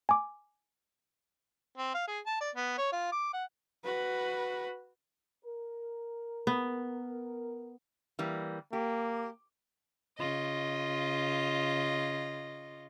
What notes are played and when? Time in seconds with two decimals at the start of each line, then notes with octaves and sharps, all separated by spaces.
0.09 G#5 D6
1.77 C4
1.94 F5
2.08 G#4
2.26 A5
2.41 D5
2.55 B3
2.78 C#5
2.92 F4
3.12 D6
3.33 F#5
3.84 F#4 B4
5.45 A#4
6.47 B3
8.19 E3 G3 A#3
8.73 A#3 G4
10.18 C#3 F4 D#5